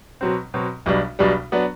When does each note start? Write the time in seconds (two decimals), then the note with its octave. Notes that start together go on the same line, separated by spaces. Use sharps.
0.21 B2 F#3 C4
0.54 B2 F#3 C4
0.86 B1 B2 G3 D4
1.19 B1 B2 G3 D4
1.52 F#3 B3 D4